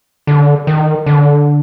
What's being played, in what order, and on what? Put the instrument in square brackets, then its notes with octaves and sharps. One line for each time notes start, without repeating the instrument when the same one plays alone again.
[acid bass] D3
D#3
D3